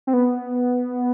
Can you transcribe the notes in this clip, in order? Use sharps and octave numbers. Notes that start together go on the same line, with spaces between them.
C4
B3